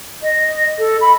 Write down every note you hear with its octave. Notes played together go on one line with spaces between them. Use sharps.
D#5
A4
B5